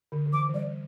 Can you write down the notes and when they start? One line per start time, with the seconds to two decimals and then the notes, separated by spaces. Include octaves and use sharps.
0.12 D3
0.26 D3
0.33 E3 D6
0.49 E3
0.54 G3 D5